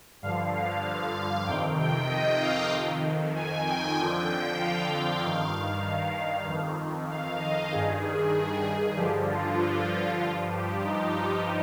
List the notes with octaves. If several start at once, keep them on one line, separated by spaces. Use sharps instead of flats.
G2 D3 F3 F5
F5
F2 C3 D#3 G5
G5
D#5
F5
F2 D#3
G#5
G5
F2 D3 F3 G5
F5
G2 D#3
F2 D#3
F5
D#5
G2 D#3 G#4
G2 D3 F3 G4
F4
G2 F3 F4
G4
D#4